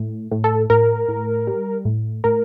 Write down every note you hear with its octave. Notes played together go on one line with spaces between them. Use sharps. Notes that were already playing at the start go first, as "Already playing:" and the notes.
Already playing: A2
A2
A4
A2 A#4
A2
G3
A2
A2 A#4